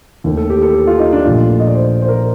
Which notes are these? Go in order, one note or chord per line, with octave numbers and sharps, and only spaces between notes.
D#2 D#3 A3
A4
G4
A4
A4
F4
D#4
D4
A#1 A#2 A3 F4
D#5
D5
C5
C5
A#4